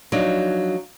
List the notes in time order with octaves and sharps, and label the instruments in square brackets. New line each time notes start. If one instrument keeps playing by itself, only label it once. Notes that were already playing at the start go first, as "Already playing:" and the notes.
[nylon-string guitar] F3 F#3 D4 D#4